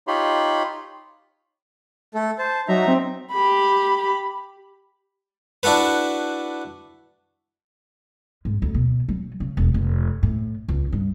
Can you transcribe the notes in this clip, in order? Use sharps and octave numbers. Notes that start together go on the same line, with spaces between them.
D#4 F4 G4 C#5 B5 C6
A3 A4
C5 A5
F#3 D#4 E5 A#5
C4
G4 B5
D4 E4 F#4 A4 B4
G#2
D2
B2
F#3
C#3
E1
F1
A2
C#2
G2